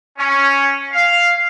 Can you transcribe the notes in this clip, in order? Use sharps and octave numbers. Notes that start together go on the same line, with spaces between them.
C#4
F5